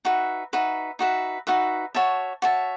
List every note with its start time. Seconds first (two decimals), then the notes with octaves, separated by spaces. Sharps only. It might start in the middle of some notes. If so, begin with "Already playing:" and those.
0.05 D#4 F#4 B4 E5
0.53 D#4 F#4 B4 E5
0.99 D#4 F#4 B4 E5
1.47 D#4 F#4 B4 E5
1.94 F#4 C#5 E5 A5
2.42 F#4 C#5 E5 A5